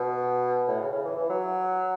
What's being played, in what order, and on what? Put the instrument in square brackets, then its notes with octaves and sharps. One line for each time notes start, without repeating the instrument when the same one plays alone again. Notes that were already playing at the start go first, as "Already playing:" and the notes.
Already playing: [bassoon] B2
A2
C#3
C#3
E3
E3
F#3